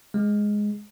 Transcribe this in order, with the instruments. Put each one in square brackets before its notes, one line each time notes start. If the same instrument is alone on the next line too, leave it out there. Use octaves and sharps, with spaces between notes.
[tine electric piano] G#3